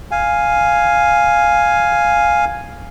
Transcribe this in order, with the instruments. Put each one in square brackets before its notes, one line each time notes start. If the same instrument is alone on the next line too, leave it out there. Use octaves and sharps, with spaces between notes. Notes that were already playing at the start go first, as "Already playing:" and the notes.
[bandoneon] F5 G#5